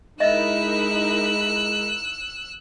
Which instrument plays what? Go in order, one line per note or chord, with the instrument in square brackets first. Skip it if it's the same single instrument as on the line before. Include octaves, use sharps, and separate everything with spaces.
[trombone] G#3 [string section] D#4 E4 A#4 [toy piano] D#5 E5 [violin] E6 F#6